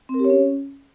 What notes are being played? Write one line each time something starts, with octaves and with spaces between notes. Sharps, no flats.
C4
A#4
G4
C#5
C#4